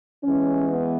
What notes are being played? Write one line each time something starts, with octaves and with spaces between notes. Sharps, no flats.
E2 E3 G#3 C#4
B3